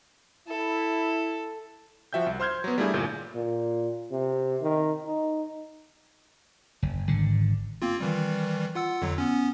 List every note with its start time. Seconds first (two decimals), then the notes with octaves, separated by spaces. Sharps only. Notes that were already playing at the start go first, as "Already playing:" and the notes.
0.48 E4 A4
2.13 F3 F#4 E5 G5 G6
2.26 C2
2.40 C5 C6 F6 G6 G#6
2.64 F#3 B3
2.78 G3 A3 A#3 D4 E4 G#4
2.93 G1 A#2 G6
3.35 A#2
4.12 C3
4.62 D#3
5.05 D#4
6.82 F#1
7.08 G#1 D3
7.82 A#3 C4 F4
8.00 D#3 E3 G3
8.75 F4 F#5 E6
9.02 F2 D3 F#3
9.18 B3 C#4